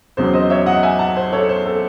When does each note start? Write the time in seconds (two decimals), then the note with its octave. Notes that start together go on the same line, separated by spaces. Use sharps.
0.17 E2 C#3 F#3 C4 C5
0.33 C5 D#5
0.50 C#5 E5
0.66 D#5 F#5
0.83 E5 G#5
0.99 F#5 A5
1.16 C5
1.32 A4 C#5
1.49 C5
1.66 A4